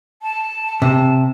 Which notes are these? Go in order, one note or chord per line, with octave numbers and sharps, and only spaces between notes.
A5
C3